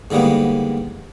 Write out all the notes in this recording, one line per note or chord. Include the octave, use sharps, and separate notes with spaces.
G#2 D3 G3 A#3 B3